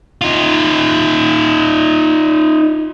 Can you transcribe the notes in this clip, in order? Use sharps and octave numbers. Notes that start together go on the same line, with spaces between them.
D#4 F4